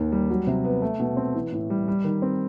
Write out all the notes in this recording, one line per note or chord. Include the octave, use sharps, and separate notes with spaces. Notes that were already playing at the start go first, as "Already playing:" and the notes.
Already playing: D#2 D#3
G3
F#3
C3
B3
A3
B2
C4
E3
A2
G3
G3
D#3
C4